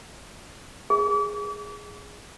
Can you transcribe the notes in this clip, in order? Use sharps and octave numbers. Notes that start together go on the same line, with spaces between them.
G#4